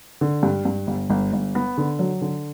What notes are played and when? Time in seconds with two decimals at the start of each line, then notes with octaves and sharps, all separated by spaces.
0.21 D3
0.43 G2
0.65 G2
0.87 G1
1.10 G1
1.33 G1
1.55 B3
1.78 D3
1.99 F#3
2.22 D3